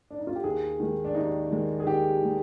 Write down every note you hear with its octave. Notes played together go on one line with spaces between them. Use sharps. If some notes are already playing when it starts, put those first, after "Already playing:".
D4
D#4
F4
G4
D#2 G#4
D#3 G#3
D4
D#2 D#4
D#3 G#3
G#4
D#2 G4
D#3 G#3